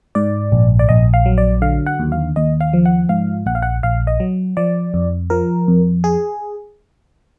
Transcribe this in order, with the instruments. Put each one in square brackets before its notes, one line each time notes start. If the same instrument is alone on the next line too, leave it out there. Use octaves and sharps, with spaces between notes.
[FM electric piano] G#2 D5
A#1
D5
A#1 D#5
F5
F#3
D5
D3 F5
F#5
D#2
F5
D#2 D#5
F5
F3
F#5
G#2 F5
A#1 F#5
F5
F#5
A#1 F5
D#5
F#3
F3 D5
F2
F3 A#4
F2
G#4